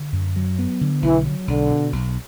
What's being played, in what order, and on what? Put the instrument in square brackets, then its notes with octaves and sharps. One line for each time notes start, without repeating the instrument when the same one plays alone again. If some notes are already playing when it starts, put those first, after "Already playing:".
Already playing: [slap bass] D3
F#2
F#3
B3
D3
[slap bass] B1 [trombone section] E3
[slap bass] F#3
[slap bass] B1 [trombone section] D3
[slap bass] B2
B1